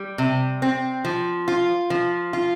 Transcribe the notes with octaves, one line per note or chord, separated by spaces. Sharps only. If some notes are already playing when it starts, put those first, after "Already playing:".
Already playing: G3
C3
C4
F3
F4
F3
F4